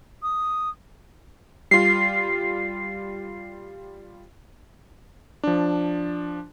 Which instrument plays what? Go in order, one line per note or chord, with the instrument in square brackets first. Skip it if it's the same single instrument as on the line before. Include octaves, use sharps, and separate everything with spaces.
[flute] D#6
[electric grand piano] G3 F4 [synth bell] C7
[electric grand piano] F3 D4